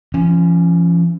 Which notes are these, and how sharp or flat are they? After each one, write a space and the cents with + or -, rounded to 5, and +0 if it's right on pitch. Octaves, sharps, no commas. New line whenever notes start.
F3 -40 C#4 +0